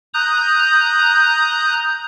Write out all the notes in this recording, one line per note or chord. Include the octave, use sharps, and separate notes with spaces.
A#5 D#6 F#6 G6